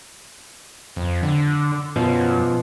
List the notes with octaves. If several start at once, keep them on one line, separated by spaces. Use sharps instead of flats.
F2
D3
F#2 B2 F3